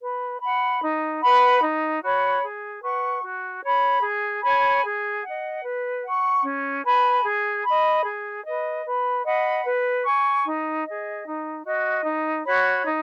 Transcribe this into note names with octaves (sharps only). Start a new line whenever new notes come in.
B4
F#5 B5
D#4
B4 F#5 B5
D#4
F#4 C#5 B5
G#4
B4 F#5 C#6
F#4
C#5 B5
G#4
C#5 G#5 B5
G#4
F#5
D#5
B4
F#5 C#6
C#4
B4 G#5 B5
G#4
D#5 B5
G#4
B4 D#5
B4
D#5 F#5 B5
B4
G#5 C#6
D#4
D#5
G#4
D#4
F#4 D#5
D#4
F#4 C#5 B5
D#4